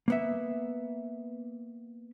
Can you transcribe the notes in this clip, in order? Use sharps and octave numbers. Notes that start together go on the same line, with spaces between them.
A#3 B3 E5